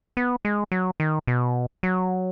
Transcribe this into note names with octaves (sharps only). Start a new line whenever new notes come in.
B3
G#3
F#3
D#3
B2
F#3